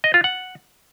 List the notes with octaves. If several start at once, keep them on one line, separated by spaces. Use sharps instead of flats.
D#5
F4
F#5